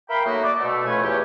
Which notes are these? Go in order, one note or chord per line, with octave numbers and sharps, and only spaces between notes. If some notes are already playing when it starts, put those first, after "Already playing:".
A#4 E5 F5 G5 B5
F#3 A3 A#3 D#4 F#4
D5 D6
B2 A3
A2 F3 A3 C#4 B4 G#5
E2 G4 C#5